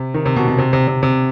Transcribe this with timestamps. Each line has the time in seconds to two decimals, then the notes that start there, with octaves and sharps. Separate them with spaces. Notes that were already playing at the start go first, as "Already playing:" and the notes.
Already playing: C3
0.14 D#3
0.26 C3
0.36 B2
0.48 B2
0.58 C3
0.73 C3
0.88 C3
1.03 C3